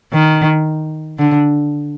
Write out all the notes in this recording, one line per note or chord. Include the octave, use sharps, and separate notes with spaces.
D#3
D3